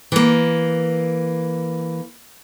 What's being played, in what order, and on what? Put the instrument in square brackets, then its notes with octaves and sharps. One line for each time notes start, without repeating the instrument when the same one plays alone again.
[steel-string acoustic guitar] E3 A#3